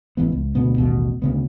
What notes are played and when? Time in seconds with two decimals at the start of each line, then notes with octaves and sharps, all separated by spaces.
0.17 A1 E3 B3
0.32 C#2
0.55 D2 B2 B3
0.78 A1 D#2 B2
1.22 D2 C#3 B3